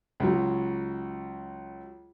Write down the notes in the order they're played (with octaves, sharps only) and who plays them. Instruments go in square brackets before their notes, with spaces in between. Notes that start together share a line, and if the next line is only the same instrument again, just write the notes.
[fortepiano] C#2 F#3